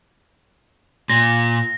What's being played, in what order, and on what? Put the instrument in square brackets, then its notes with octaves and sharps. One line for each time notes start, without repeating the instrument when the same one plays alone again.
[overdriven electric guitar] A#2 [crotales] A#6